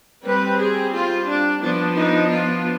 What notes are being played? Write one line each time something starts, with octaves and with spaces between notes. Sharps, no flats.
G3 C4 B4
G#4
F4
D4
F3 B3 D4
D#4
F4